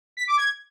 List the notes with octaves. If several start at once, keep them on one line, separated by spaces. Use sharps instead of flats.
B6
D6
G#6